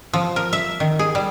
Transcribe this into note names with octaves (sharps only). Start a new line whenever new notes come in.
F3
A#4
E5
D#3
G#4
G3